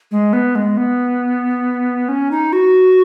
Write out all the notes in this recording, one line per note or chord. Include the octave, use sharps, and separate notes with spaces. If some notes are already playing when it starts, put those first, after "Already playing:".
G#3
B3
G#3
B3
C#4
D#4
F#4